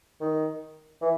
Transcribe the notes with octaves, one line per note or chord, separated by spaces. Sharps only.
D#3
E3